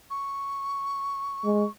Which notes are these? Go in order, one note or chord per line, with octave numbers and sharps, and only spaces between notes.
C#6
G#3